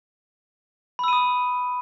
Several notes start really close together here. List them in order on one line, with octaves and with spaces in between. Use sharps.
B5 E6 D#7 D#6